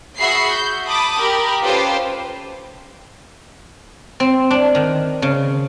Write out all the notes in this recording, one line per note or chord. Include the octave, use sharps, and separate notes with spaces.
F#4 G#4 E5 F#5 B5 C7
G6
A5 B5 D6 D#6
G4 A#4 B5
C#4 F4 G4 A4 B4 C5
C4
D4
D#3
C#3